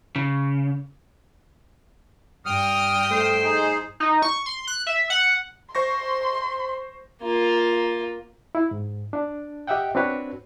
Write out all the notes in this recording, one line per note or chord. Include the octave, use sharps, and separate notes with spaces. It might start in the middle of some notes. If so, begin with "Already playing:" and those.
C#3
G2 G5 D#6 F6
A3 C5
D#4 G#4
D#4
C#6
C6
F#6
E5
F#5
C5 C6 C#6 A#6
A#3 F4
E4
G#2
D4
G4 D#5 E5 F#5 G5
C4 D4 F#4 B4 C#5